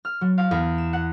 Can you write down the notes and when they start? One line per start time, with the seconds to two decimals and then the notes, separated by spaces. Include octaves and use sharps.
0.05 F6
0.21 F#3
0.38 F5
0.51 E2
0.78 E7
0.93 F#5